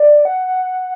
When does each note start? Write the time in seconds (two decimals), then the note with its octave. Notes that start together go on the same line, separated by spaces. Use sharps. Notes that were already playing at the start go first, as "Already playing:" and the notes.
Already playing: D5
0.25 F#5